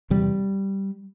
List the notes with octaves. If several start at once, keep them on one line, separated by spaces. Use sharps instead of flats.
E2 C3 G3